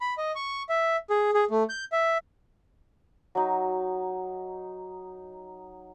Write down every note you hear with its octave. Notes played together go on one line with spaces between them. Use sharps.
B5
D#5
C#6
E5
G#4
G#4
A3
G6
E5
F#3 D#4